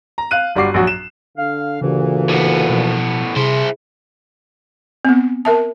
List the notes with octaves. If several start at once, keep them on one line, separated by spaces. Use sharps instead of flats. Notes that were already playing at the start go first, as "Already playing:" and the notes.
A#5
F5 F#6 D#7
G1 G3 F#4 D6 C7
A#1 F#3 F#4
E7
D3 F5
D2 A#2 C#3 E3 D4 G4
A2 B3
B2 F3
C3 E4 G#4 C5
B3 C4
A#4 E5 A5